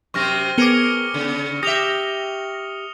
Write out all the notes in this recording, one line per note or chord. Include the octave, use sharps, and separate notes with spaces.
F#2 C3 C4 C#6 F6 A#6
B3 G#4 A#4 D6 C#7 G7
C#3
G4 E5 D#6 A#6 F7 G7